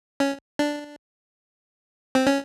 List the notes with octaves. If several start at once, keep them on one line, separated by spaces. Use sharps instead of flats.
C#4
D4
C4
C#4